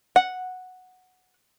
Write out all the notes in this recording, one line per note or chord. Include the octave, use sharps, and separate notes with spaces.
F#5